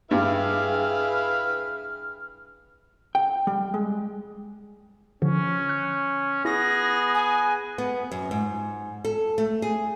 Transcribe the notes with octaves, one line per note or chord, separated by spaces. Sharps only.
G2 E4 G#4 B4 F5 F6
G5
G3
G#3
D3 F3 C#4
F#6
B3 E4 G#4 A#6
G#5
B3
F#2
G#2
A4
A3
G#4